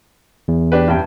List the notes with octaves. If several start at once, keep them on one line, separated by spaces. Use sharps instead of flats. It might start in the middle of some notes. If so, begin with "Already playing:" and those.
E2
D4 G4 B4
A1 G2 G5